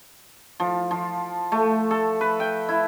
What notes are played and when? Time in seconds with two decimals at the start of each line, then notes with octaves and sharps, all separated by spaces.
0.60 F3
0.91 F3
1.52 A3
1.91 A4
2.21 B4
2.40 G5
2.69 E4